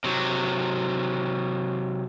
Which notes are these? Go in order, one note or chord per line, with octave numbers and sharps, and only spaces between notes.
C3 F#3